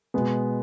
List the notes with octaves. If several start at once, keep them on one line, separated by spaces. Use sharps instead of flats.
B2 G#3 B3